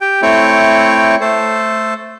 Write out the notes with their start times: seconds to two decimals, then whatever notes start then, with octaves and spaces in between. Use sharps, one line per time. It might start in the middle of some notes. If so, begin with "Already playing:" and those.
0.01 G4 G5
0.22 A3 C4 E4 C#5 G5
1.21 A3 A4 C5